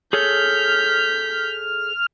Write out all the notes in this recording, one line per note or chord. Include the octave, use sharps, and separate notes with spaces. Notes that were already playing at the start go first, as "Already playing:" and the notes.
G#4 A4 C#5 F6 G6 B6